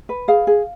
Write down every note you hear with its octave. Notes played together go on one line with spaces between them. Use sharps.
B4
G#4 F5
G#4